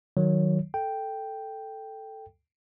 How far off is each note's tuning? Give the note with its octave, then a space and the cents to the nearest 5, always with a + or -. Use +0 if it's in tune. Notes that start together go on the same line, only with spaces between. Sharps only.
D#3 +0 F#3 +0 C#5 +0
A4 +0 G5 +0